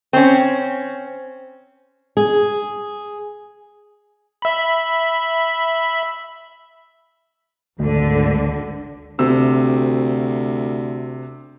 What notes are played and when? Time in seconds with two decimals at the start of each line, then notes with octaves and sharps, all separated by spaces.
0.13 C4 C#4
2.17 G#4
4.42 E5 B5
7.79 G#1 D2 D3
9.19 D2 C3 E6